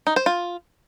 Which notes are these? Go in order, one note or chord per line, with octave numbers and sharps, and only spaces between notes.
D#4
C5
F4